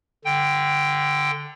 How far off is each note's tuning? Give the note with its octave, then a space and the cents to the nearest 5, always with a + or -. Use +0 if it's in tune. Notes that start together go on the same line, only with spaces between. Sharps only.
D3 +0 G5 +0